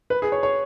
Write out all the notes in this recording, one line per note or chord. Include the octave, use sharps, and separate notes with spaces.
B4
G#4
C#5
C#5